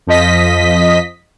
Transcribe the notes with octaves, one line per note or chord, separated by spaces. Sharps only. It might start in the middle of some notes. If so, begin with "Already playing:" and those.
F2 F3 D#5 B6